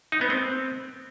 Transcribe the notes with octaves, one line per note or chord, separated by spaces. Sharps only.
D#4
B3
C4